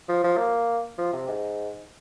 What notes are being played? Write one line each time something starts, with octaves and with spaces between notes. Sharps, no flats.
F3
F3
A#3
F3
C3
G#2